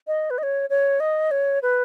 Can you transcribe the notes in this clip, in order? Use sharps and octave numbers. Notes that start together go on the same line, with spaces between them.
D#5
B4
D#5
C#5
C#5
D#5
C#5
B4